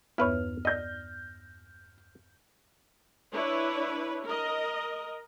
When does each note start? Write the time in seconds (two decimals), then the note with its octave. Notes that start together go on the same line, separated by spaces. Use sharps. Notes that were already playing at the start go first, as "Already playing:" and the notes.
0.18 E2 G2 B3 E4 B4 C#5 F6
0.65 D5 D#5 G6 A#6
3.33 D4 E4 B4 C#5
4.25 A#4 D#5